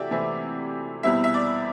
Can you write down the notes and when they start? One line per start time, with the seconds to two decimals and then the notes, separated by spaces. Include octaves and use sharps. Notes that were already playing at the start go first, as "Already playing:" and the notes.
Already playing: C3 E3 A3 E4 F#4 G4 D5 E5
0.11 C3 E3 A3 C4 E4
1.03 E2 B2 G3 C4 E4 E5
1.24 E5
1.34 D5